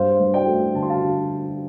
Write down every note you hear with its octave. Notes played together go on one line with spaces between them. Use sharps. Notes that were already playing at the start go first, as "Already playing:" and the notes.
Already playing: G2 C5 F5
G2
D5 G5
A3
D3 A5
C6
F5 A5
D3